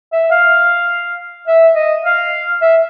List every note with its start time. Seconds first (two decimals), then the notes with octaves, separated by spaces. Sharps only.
0.13 E5
0.31 F5
1.48 E5
1.75 D#5
2.05 F5
2.62 E5